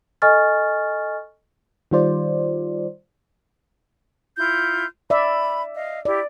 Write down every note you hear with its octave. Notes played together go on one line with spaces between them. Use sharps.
A4 D#5 G#5 C#6 F6 A6
D#3 G3 F4 C5 D5
E4 F4 G6
D5 E5 B5
D#5 F5
E4 G4 D5